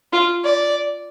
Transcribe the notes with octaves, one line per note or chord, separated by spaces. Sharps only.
F4
D5